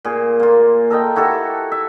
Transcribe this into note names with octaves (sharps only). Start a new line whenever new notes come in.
A#2 G#4
A#3 F4
A4 A#4 D#5 G5
E4 F#4 G4 A4
E5